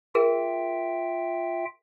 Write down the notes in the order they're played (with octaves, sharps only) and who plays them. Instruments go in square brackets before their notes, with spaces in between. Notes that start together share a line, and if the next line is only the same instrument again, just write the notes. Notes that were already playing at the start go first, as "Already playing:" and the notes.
[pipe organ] F4 E5 G5 [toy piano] G#4 A#4